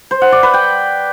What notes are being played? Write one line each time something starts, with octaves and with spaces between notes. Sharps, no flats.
C5
F#5
D5
B4
G5